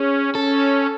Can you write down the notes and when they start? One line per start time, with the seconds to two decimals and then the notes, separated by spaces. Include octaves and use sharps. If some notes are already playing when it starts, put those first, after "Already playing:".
Already playing: C#4 G#4
0.34 C#4 A4